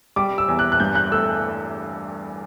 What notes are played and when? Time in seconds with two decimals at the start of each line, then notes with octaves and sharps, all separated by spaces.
0.16 G3 D6
0.38 E6
0.48 E2
0.59 F#6
0.72 F#6
0.80 G2 G6
0.95 F#6
1.12 A3 E6